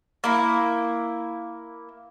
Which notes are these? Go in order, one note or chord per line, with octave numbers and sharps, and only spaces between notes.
A#3 E4